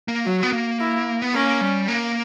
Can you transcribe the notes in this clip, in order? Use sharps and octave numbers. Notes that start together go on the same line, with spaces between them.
A#3
F#3 F#4
B3
A#3
E4
B3
A#3 C#4
G3
A#3